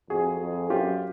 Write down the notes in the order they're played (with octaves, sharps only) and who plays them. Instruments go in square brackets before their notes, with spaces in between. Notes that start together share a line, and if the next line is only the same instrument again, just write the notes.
[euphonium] F2 [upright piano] F#4 G#4
[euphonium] F2
[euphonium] F#2 [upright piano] F4 G4